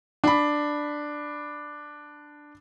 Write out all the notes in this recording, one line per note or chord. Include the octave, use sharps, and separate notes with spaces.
D4 B5